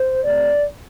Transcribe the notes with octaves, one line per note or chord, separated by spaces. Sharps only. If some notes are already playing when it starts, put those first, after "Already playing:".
Already playing: C5
C3 A3 C4 D5